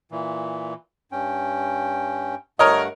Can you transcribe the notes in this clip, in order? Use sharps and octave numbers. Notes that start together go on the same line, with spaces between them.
A#2 E3
G2 C#4 G5
G2 A3 A#4 C#5 D#5 F#5